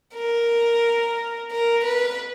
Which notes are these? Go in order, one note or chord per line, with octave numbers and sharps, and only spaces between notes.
A#4
A#4
B4